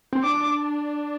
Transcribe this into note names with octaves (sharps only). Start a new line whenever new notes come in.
C4
D4 D6